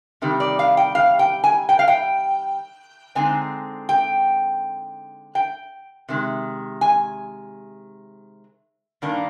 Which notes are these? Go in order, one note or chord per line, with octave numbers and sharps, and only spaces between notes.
C3 D#3 G3
D5
F5
G5
F5
G5
G#5
G5
F5
G5
D3 G#3 C4 D#4 G#5
G5
G5
C3 D#3 G#3
G#5
G2 D#3 A#3 D4